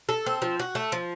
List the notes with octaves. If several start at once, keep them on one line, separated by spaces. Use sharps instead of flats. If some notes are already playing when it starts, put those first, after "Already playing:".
A4
C4
F3
F#4
A3
F3